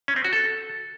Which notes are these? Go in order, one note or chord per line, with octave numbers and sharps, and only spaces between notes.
C#4
C4
F#4
A4